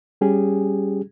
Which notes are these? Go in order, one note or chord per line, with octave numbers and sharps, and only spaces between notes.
G3 C#4 G4 G#4